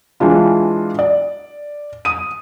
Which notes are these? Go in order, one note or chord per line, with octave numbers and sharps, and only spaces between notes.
E3 G#3 D4 F4
D5
D#6 D#7